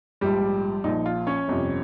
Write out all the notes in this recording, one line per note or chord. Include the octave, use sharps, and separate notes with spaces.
A#1 G#2 F3 G3 G4
A#1 A#2 F3 D#4
F4
C#4 C#5
G1 F2 C3